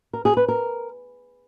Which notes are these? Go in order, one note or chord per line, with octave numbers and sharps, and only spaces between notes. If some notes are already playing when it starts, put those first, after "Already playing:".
A#4
G#4
B4
A#4